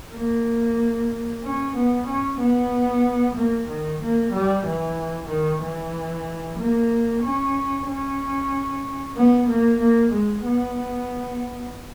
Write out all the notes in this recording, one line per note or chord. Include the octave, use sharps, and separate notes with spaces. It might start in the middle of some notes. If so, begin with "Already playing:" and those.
A#3
C#4
B3
C#4
B3
A#3
D#3
A#3
G3
E3
D#3
E3
A#3
C#4
C#4
B3
A#3
A#3
G#3
B3